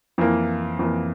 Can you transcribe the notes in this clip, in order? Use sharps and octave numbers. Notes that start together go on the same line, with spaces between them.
F2 E3 A#3
F2 E3 A#3